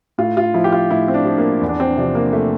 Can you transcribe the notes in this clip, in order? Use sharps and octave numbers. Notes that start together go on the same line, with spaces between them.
A2 F4
F4
F3 E4
G4
F4
A2 E4
C4
D4
F3
A#3
E2
D4
C4
C3 F3 D4
A#3
A3